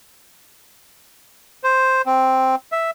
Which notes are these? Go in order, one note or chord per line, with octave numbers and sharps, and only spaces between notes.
C5
C4
E5